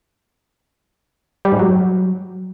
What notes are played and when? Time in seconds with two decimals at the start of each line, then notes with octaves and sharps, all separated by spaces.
1.45 G3
1.52 G#2
1.59 F#3